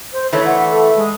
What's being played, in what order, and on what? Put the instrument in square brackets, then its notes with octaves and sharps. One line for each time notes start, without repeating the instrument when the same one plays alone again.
[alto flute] C5
[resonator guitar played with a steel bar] E3 A3 [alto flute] C#5
[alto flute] F#5
A4
G#3